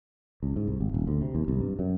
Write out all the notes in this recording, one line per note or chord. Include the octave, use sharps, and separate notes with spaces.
C#2
G#2
C2
G#1
D#1
D2
C3
D#2
C2
G2
F#2